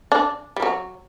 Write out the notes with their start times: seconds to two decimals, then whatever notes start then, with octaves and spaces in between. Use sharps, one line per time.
0.12 D4
0.56 G3
0.62 F#3